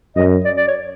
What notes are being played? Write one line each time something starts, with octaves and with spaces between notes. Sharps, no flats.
F#2 D#5
D5
D5
C#5